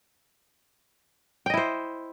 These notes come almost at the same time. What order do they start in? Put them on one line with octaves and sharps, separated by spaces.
G5 D#5 E4 C5